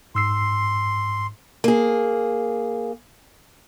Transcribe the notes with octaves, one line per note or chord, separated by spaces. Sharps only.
G#2 C6 E6 C7
A#3 G#4